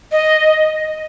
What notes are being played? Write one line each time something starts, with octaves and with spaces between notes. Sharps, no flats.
D#5